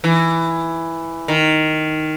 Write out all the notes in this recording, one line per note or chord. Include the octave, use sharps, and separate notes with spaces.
E3
D#3